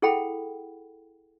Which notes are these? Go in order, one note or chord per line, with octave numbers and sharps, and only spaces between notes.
E4 G#4 A4 F#5 G5 B5